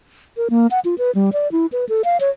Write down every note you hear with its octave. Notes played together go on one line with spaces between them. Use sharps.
A#4
A#3
F#5
F4
B4
G3
D5
E4
B4
A4
F5
C#5